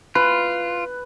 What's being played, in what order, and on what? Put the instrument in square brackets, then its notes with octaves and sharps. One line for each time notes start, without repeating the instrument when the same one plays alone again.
[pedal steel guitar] F4 [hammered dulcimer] B4